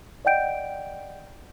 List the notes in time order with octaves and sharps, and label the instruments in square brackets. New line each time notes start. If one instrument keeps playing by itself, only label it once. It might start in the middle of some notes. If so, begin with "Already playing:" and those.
[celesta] D5 D#5 F#5 G5 G6 D7